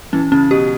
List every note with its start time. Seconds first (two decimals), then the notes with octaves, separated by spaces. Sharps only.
0.13 E3 C#4
0.32 C#3 C#4
0.51 B2 G4